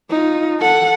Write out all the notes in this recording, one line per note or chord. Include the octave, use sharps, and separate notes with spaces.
D#4 F4
A4 F#5